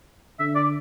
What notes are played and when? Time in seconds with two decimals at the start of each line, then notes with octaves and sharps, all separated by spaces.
0.39 D3 E5
0.55 D5